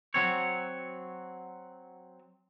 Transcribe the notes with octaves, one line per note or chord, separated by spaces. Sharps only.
F#3 C4 C#5